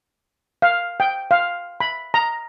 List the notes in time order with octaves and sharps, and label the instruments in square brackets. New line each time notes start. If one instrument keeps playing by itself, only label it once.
[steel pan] F5
G5
F5
B5
A#5